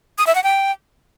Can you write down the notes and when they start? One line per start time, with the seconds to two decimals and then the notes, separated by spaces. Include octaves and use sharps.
0.18 D#6
0.27 E5
0.35 F#5
0.44 G5